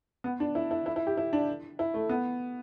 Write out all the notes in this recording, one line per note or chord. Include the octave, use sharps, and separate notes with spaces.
B3
D4
E4
E4
E4
E4
G4
E4
D4
E4
A3
B3